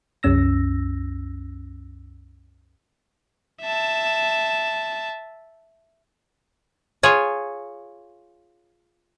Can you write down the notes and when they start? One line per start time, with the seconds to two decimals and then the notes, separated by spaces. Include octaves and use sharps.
0.23 C2 F#2 C#4 E6 A#6
3.61 E5 A5
7.03 F4 G#4 C#5